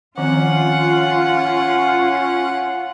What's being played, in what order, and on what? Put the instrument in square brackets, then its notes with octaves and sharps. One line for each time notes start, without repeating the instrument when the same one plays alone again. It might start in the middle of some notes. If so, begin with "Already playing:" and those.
[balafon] D#3 F3 C4 [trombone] C#4 [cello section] F4 [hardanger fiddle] F#5